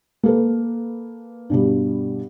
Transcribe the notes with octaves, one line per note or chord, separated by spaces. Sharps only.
A#3 A4 B4
G2 B2 G3